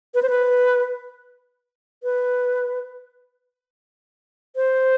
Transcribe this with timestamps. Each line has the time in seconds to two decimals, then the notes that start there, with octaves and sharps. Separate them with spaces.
0.14 B4
0.23 C5
0.29 B4
2.03 B4
4.56 C5